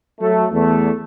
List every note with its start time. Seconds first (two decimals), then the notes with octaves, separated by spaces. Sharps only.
0.20 F#3 A3
0.52 E2 A3